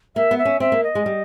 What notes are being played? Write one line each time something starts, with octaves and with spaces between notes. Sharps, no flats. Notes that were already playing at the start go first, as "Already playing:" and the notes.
A#3 E5
B3
E5
C#4
C4 E5
A#3
D#5
G#3
G3